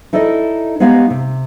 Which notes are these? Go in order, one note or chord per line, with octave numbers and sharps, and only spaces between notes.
D#4 E4 A4 D5 D#5
G#3 B3 D#4 G4 C#5 F5
C3